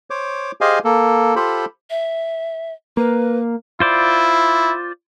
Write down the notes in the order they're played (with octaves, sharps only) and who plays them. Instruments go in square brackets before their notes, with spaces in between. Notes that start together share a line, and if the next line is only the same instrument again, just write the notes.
[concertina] C5 C#5 D6
G4 G#4 C5 D#5 F5 G#5
A#3 A4
F4 G4 A4 C5 B5
[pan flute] E5
[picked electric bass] A#3 [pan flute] B4
[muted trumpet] E4 [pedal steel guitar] F4 C5 D5